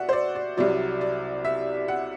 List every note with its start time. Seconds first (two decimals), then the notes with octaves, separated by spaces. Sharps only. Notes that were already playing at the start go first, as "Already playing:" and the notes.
Already playing: B2 D5 E5 F#5
0.09 C5
0.13 D5
0.35 D5
0.57 C2 C3 F#3 D5
1.01 D5
1.45 E5
1.88 F#5